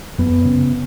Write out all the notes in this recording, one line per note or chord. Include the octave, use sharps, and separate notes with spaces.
F#2 B3
C#3